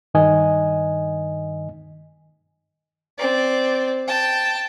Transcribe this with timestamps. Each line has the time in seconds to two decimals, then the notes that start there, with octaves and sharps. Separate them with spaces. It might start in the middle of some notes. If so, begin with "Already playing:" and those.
0.14 G2 D#3 D#5 G#5
3.19 C4 D5
4.08 G5 A5